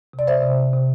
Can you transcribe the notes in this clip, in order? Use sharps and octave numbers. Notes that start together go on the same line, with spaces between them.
C3
D5
C5 E5
C3
C3